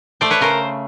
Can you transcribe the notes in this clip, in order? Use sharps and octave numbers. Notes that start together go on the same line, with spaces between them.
A3 C5 D5
B4 C#5
C#3 A#4 C5